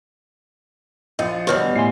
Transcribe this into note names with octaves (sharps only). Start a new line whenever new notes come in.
A#1 F4 D#5
D#1 D2 B2 E3 G3 G4 B4 C#5
A2 E5 G#5 C6 C7